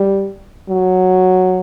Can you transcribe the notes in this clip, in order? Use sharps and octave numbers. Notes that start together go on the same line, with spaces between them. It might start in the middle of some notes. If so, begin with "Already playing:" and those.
Already playing: G3
F#3